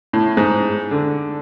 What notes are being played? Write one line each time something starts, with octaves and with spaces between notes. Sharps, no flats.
A2
G#2
D3